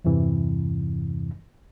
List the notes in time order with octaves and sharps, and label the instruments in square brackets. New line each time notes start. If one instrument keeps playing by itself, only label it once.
[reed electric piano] E2 G2 C3 E3